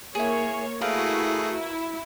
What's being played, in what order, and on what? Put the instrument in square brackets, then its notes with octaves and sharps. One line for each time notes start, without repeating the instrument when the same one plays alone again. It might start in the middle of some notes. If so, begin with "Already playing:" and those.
[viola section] A#3 C#5 [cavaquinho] E4 G#4
[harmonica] A3 G#4 [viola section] E4 F#4 [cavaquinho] A#4 B4 F5
[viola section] E4